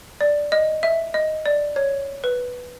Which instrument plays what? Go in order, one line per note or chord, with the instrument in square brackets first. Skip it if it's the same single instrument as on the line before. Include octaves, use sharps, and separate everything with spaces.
[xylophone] D5
D#5
E5
D#5
D5
C#5
B4